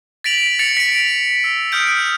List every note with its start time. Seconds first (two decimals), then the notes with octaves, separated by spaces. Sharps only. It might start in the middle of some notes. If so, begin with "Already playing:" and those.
0.24 A6 B6 D7 F7 F#7
0.59 A6 B6 C#7 F7
0.77 B6 C#7 D7
1.44 E6
1.72 D#6 F6 G6 D7